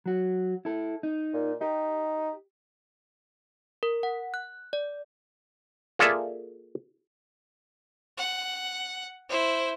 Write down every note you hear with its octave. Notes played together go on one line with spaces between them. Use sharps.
F#3 F#4
E4 A4
D#4
A#2
D#4 G4
A#4
F#5
F#6
D5
A#3 F4 G#4 A4 D5 E5
F#5
E4 C5